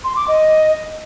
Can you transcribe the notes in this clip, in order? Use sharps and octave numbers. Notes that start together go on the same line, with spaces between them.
C6
D6
D#5